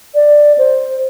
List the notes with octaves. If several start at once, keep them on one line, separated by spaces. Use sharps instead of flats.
D5
C5